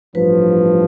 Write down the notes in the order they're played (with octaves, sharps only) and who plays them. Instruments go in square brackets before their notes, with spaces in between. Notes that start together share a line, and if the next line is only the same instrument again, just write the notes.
[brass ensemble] A1 G2 F3 [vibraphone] B4